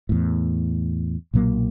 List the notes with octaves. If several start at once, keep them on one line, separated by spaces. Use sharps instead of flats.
E2 A2
B1 A#2 F#3 A#3